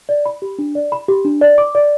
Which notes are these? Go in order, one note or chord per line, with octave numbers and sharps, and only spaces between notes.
D5
B5
G4
D4
D5
B5
G4
D4
D5
D6
D5